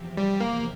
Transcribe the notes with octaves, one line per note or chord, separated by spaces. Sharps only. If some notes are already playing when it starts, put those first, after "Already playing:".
Already playing: E2 C3 F3 C4 G4
G3
A#3